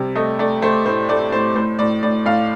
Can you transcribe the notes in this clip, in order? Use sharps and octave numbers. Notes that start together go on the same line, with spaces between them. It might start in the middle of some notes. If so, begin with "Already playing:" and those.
Already playing: C3 G3
A3 D#5
A3 D5
A3 C5
A2 C5
A3 D5
A2 C5
A2 C5
A2 D5
A2 D5
A2 F5